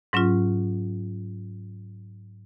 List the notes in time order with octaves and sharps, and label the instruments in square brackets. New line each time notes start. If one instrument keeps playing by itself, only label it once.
[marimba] G#2 F#3 C#4 F4